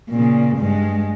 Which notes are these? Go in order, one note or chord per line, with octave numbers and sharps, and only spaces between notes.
A#2 C#3
G2 G#3